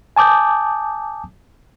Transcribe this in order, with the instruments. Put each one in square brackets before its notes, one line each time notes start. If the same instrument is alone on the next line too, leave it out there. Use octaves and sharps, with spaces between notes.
[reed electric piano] G#5 A5 D6 D#6 G6